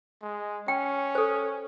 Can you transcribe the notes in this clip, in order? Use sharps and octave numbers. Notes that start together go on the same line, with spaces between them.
G#3
C#4 G5
A4 C5